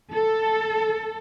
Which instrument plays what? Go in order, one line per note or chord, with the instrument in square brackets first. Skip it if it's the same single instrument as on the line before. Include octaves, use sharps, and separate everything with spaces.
[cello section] A4